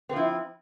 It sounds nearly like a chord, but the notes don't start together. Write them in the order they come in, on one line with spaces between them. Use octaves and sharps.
C4 F3 E4